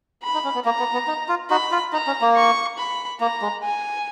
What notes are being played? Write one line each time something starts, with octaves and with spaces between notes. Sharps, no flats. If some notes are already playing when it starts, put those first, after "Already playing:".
B5
D#4
C#4
B3
A#3 A#5
B3
B3
D#4
F4
D#4 F#4 B5
F4
D#4 A#5
C#4
A#3
C#6
B5
A#3 A#5
G#3
G#5